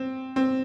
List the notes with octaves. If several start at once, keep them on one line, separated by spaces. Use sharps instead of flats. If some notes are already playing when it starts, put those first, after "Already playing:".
Already playing: C4
C4